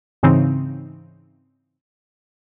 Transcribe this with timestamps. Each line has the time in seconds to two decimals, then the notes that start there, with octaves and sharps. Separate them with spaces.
0.23 G#2 C#3 E3 C4 D#4